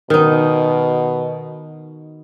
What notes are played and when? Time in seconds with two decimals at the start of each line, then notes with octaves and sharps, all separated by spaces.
0.10 B2 D#3 D#4